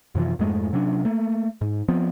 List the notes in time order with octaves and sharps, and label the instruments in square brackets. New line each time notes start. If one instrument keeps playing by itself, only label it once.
[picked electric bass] F#2 C3 E3 F3
F2 G#2 G#3 A3
C3 F#3 C#4 D4
A3 A#3
G#2
F3 B3 C4